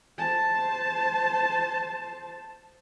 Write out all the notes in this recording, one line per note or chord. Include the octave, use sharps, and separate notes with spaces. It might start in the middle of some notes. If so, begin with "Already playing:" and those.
C5 A5